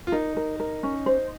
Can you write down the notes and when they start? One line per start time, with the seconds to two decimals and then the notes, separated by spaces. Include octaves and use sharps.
0.07 F4
0.12 D#4 A#4
0.37 A#4
0.60 A#4
0.83 C#4
1.06 C5